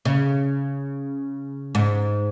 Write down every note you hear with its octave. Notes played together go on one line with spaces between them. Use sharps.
C#3
G#2